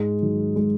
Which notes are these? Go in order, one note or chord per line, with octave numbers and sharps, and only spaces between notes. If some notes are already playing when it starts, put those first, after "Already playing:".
Already playing: G#2 G#3
D#3 F#3
G#3